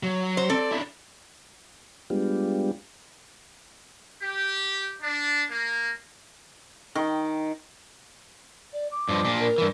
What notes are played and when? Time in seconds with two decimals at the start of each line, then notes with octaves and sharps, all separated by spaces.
0.03 F#3
0.37 C5
0.49 C4 A4 D5
0.72 D4 E4
2.10 G3 G#3 B3 D4 F4 G4
4.22 G4
5.01 D4
5.50 A#3
6.95 D#3
8.73 D5
8.92 D6
9.09 G2 F3
9.24 A#2 D4
9.40 A#4
9.58 G2 E3